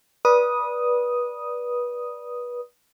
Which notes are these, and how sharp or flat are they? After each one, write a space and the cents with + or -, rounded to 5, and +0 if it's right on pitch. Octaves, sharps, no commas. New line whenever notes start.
B4 -25 D5 -5 D#6 +0